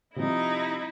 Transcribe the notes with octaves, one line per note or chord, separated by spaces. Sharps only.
C3 F3 G3 D#4 E4